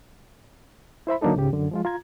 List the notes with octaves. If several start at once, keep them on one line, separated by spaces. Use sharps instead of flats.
E4 C5 E5 B5
D3 F#3 A#3 D4 D#4 A4
C#2 G#2 C#3 G4
F#2 D3
F3 G#3 F4
F4 A#5 G#6